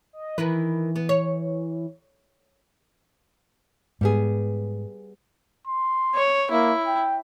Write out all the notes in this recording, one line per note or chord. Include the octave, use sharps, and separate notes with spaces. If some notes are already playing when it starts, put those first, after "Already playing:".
D#5
D#3 E3 E4 B4
B3
C#5
G#2 G3 B3 G#4
C6
C#5
A#3 E4
G5